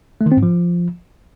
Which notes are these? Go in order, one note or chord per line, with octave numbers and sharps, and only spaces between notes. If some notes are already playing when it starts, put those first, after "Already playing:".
A3
D#3
C4
G#2
F3